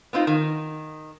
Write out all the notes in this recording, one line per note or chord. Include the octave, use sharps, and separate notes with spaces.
B3 C4 D#4 F4
D#3